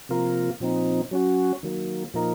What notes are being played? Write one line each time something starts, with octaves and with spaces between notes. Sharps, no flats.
C3 F3 A#3 F4 A#4
A#2 F3 C4 D#4
F#3 C#4 F#4
D#3 F#3 A#3
A#2 F3 A#3 D#4 A#4